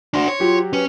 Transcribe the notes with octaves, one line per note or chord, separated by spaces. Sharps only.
D4 F#4 C6 A#6
C#5
F#3 F4 G4
C#4 B4